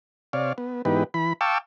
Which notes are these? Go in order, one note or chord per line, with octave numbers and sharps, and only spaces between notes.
C3 C#5 D5 F5
B3
G#2 E3 B3 D#4 G4 B4
E3 B5
F5 G5 A5 C#6 D6 E6